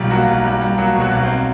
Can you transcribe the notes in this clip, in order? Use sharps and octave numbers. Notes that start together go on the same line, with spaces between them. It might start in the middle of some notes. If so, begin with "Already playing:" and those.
Already playing: B1 B2 F3 G3 A#3 F4
F#3 A#3 F#4
B1
G3
G3
F#3 A#3 F#4
B2
F#3 F#4
B1
C4 C5